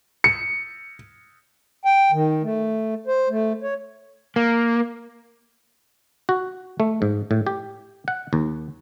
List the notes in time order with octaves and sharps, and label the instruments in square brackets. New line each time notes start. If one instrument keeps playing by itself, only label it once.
[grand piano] C#7
[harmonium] G5
D#3
A3
C5
A3
C#5
[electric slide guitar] A#3
[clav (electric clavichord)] F#4
A3
G#2
A2
G4
F#5
D#2